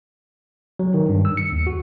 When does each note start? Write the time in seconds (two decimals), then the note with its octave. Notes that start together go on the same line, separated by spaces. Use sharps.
0.79 F#3
0.94 D#3
1.09 G2
1.25 E6
1.37 C#7
1.52 D#2
1.67 F#4